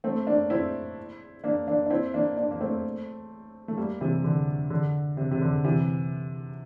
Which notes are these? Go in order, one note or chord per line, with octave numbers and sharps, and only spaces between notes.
A3 C4
A#3 D4
C4 E4
A#3 D4
A#3 D4
D4
C4 E4
A#3 D4
A#3 D4
A#3
A3 C4
A3
G3 A#3
C3 E3
D3
D3
C3
C3
D3
C3 E3